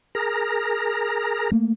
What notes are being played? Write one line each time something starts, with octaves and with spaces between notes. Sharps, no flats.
G#4 A#4 A#5
A3 A#3